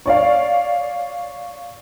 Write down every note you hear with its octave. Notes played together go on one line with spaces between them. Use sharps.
C#5 D5 F5